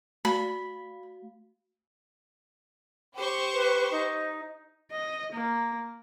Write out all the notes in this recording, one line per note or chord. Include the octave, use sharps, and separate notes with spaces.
A3 F#4 F5 B5
G4 C5 C#6
B4
D#4
D#5
A#3